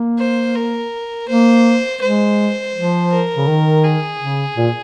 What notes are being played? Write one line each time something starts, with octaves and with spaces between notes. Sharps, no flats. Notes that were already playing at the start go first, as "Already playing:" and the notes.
Already playing: A#3
C5
A#4
A#3 C5
G#3 C5
F3
A#4
C#3
D#3
G#4
C#3
A#2